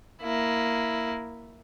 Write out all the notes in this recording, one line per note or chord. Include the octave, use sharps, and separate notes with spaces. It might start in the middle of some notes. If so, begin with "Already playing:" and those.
A#3 E4